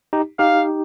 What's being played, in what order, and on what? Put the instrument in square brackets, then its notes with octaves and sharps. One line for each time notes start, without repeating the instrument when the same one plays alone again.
[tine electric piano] D#4 G4
[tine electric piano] D#4 G4 [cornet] F5